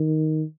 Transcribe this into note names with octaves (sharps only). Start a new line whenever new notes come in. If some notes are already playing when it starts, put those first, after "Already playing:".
Already playing: D#3